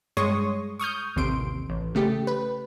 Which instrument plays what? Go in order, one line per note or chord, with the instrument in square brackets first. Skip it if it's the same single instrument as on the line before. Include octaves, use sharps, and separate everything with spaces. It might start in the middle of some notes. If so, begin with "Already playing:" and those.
[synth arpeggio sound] G2 G#3 C#5 C6 C#6 D#6
C#6 D#6 F6 G6
A1 D#2 C3 C6 D7
A1
C#3 A3 G4
B4